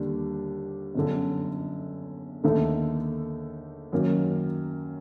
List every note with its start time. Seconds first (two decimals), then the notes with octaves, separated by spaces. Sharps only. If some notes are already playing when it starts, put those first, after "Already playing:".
Already playing: D#2 D3 G3 D4
0.95 G1 F#2 D3
2.44 D#2 D3 A3 D#4 A4
3.93 F#2 D#3 F#3 A#3